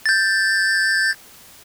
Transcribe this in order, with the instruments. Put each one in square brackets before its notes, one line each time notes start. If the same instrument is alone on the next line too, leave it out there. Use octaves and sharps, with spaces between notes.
[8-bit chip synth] G6 A6